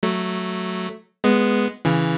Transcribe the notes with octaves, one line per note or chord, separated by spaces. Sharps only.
F#3 A3
G#3 B3
C#3 E3